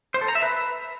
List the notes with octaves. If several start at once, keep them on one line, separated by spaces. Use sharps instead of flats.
C5
A4
A#5
E5
B4